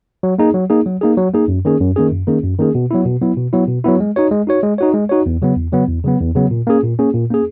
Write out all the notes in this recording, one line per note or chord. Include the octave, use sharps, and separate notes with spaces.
F#3
A#3 D#4 G#4
F#3
A#3 D#4 G#4
F#3
A#3 D#4 G#4
F#3
A#3 D#4 G#4
F#2
D#3 A#3 C#4 G#4
F#2
D#3 A#3 C#4 G#4
F#2
D#3 A#3 C#4 G#4
F#2
D#3 A#3 C#4 G#4
B2
F#3 B3 E4
B2
F#3 B3 E4
B2
F#3 B3 E4
B2
F#3 B3 E4
G#3
D#4 F#4 C#5
G#3
D#4 F#4 C#5
G#3
D#4 F#4 C#5
G#3
D#4 F#4 C#5
E2
C#3 F#3 B3
E2
C#3 F#3 B3
E2
C#3 F#3 B3
E2
C#3 F#3 B3
A#2
A#3 C#4 G#4
A#2
A#3 C#4 G#4
A#2
A#3 C#4 G#4